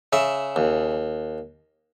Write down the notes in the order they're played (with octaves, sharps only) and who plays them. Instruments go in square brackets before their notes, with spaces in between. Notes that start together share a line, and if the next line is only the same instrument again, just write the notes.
[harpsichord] C#3 E5
D#2